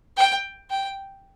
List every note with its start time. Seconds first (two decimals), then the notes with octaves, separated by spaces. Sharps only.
0.17 G5
0.70 G5